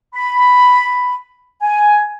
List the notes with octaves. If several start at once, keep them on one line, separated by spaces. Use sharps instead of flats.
B5
G#5